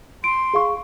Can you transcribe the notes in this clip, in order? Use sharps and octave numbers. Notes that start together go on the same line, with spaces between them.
C6 D7
G#4 F5 C#6